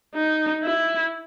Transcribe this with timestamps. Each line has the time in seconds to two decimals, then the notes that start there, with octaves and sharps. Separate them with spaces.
0.15 D#4
0.64 E4